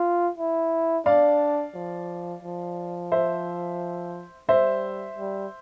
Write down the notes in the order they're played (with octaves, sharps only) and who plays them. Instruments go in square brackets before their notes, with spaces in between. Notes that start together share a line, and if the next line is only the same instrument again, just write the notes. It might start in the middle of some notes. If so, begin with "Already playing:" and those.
Already playing: [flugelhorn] F4
E4
[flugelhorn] D4 [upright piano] D5 F5
[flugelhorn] F3
F3
[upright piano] C5 E5
[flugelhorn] G3 [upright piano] C5 E5
[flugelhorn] G3